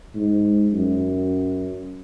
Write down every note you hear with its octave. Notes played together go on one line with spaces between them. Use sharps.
G#2
F#2